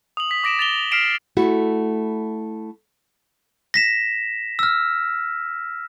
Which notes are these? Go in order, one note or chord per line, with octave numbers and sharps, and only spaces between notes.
D#6 F#7
B6
D6 A#6 D7 E7
A6 F7 G7
F6 B6 C7 D7 E7
A3 E4 F#4 A4
A#6 B6 E7
E6 F6